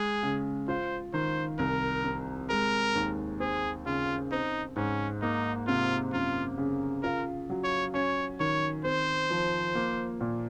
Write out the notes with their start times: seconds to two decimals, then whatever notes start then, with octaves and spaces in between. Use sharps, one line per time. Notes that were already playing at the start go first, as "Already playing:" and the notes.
Already playing: G#3 G#4
0.23 C#3
0.68 F4 C5
1.14 D#3 C5
1.59 C2 A#4
2.04 C3
2.50 G#3 A#4
2.95 D#2
3.40 C4 G#4
3.86 C#3 F4
4.32 C4 D#4
4.76 G#2 C#4
5.22 A#3 D#4
5.67 C3 F4
6.12 F#2 F4
6.58 C#3
7.03 F4 A#4
7.50 F#3
7.64 C#5
7.94 C#4 C#5
8.40 D#3 C#5
8.85 C4 C5
9.30 F3
9.75 A#3
10.21 A#2